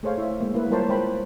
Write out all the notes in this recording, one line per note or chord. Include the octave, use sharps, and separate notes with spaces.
A3 G#4 C5 C#5 F5
E4 E5
G#3 A#3
A#3 E4 B4
G3 F4 A#4 C5 C#5 A5
G#3 C5 G5 B5